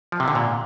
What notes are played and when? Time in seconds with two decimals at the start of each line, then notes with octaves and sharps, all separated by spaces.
0.12 F3
0.20 C3
0.28 D3
0.35 A#2